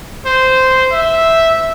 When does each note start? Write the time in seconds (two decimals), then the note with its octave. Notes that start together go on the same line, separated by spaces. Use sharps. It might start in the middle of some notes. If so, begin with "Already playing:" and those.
0.26 C5
0.92 E5